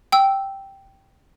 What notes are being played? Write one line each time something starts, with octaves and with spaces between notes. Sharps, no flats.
G5 E6